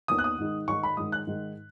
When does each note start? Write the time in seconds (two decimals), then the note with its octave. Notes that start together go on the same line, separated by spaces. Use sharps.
0.08 D#2 D#3 B3 D#6
0.18 F#6
0.24 D#6
0.38 G#2 D#3 G#3
0.68 G#2 D#3 G#3 C#6
0.83 B5
0.97 G#2 D#3 G#3 D#6
1.12 F#6
1.27 G#2 D#3 G#3